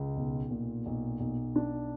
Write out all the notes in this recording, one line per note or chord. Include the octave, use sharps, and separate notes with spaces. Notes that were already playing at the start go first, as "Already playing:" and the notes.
Already playing: C#2
B1
A#2
B1
B1
D4